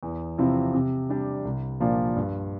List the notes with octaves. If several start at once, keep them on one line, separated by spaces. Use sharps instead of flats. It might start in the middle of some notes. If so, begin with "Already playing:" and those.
E2
C3 F3 C4 E4
C3
G3 D4 G4
C2
A#2 F3 A#3 D4
G2